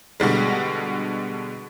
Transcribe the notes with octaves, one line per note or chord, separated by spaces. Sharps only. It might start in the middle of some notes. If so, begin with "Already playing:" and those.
B2 D3 G3 G#3